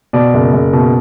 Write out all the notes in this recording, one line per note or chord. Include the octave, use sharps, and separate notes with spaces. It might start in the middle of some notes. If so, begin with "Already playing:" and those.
B2 D5
F#1
F#1
B2